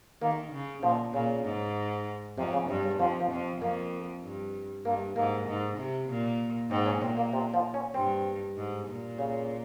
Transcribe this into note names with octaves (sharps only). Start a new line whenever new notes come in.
D#3 A#3
C#3
A#2 F3
A#2 C#3
G#2
F2 C3
C#3
G2 C3
C#3
F2 F3
F3
F2
F2 A#3
G2
G2 A#3
G#2 A#3
G#2
C3
A#2
G#2 C4
C#4
A#2 C4
A#3
C3
F3
C#4
G2 C4
G#2
A#2
C#3